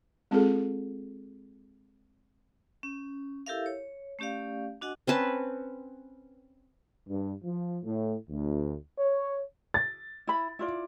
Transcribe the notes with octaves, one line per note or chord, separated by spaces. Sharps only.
G#3 C4 F4 G#4 A4
C#4
E4 G4 A4 A#4 E5 F5
C#5
A3 C#4 G4 D5 F5
D4 F#4 D#5 F#5 G#5
C4 C#4 B4 A5
G2
F3
A2
D2
C#5
A6
E4 B5
E4 F4 D5